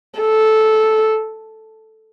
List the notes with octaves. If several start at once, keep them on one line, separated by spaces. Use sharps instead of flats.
A4